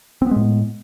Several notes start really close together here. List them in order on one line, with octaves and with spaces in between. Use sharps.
C4 B3 G#3 A2